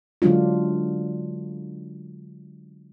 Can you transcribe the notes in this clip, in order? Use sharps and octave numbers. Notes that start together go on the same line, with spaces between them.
D3 F#3 G#3 D4 F4